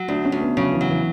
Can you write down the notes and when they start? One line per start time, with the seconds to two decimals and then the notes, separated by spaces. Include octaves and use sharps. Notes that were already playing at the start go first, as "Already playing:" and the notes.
Already playing: F#3
0.08 D2 D4
0.25 C#4
0.32 D2
0.41 B3
0.57 C#3 F#3
0.73 E3
0.81 F#3
0.90 E3